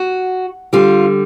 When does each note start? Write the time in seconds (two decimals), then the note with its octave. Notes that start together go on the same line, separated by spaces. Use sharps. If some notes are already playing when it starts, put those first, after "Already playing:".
Already playing: F#4
0.73 D3 G3 F4